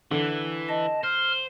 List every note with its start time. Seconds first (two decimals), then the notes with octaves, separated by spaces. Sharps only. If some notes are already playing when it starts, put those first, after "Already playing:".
0.11 D3 E3
0.68 D#5 A5
1.03 C5 F6